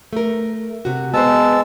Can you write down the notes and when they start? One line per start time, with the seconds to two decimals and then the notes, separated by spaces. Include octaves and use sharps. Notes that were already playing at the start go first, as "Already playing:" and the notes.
0.13 A3 A#4
0.85 C3 F#4
1.14 G#3 B3 C5 A5 E6